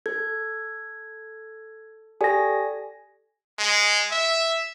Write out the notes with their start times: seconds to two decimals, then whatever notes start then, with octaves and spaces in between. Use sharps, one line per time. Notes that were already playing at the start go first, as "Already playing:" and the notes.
0.06 A4 G#6
2.21 G4 A4 D5 G#5 A#6
3.59 G#3
4.11 E5